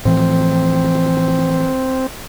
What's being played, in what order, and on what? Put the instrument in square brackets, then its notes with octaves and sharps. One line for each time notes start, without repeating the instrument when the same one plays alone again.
[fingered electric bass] A2 E3 F3 [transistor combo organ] C4